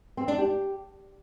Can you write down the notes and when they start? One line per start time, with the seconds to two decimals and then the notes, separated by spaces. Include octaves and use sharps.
0.17 C4
0.28 D4
0.38 G4